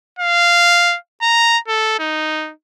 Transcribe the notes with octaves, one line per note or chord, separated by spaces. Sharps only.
F5
A#5
A4
D#4